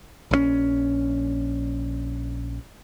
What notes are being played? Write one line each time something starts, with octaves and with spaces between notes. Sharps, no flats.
A#1 D3 C#4